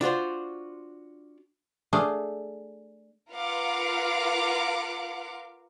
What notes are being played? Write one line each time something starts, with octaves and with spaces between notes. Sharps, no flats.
D4 F4 F#4 C5
A3 D4 G#4 F5
F4 A#4 B4 F5 F#5 D6